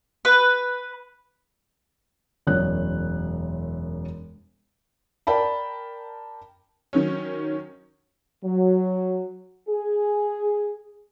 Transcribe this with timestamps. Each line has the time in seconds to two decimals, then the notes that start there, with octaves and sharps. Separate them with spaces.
0.25 B4
2.47 E1 F#2 C#5 F#6
5.27 A#4 D5 G5 A5 B5
6.93 D#3 F#3 C#4
8.44 F#3
9.69 G#4